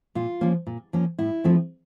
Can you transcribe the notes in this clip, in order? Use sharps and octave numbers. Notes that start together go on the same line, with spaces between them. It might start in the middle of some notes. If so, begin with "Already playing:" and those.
A#2 F4
F3 A#3 C#4
A#2
F3 A#3 C#4
A2 E4
F3 A3 C4